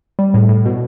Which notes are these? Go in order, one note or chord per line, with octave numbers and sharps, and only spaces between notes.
G3
A2
A2
B2